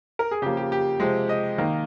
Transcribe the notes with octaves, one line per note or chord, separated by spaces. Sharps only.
A#4
G#4
C#3 F3 A#3 G4
G4
G4
C3 F3 G#3
D#5
D#3 A#3